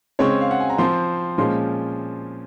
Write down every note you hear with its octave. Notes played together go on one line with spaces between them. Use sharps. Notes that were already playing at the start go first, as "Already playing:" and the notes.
C#3 G#3 C4 C#5 C#6
F5
F#5
G#5
A#5
F3 C4 C5 C6
A#2 F3 G#3 C#4 C5 C6